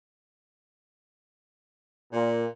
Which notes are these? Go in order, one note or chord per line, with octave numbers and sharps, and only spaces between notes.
A#2